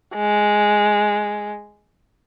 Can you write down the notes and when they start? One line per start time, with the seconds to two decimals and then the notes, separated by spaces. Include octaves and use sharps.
0.16 G#3